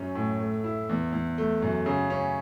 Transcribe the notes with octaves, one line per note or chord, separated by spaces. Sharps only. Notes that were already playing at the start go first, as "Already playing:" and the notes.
Already playing: F#2 C#4
A2
A3
E4
E2
E2
A3
F#2
C#3
C#4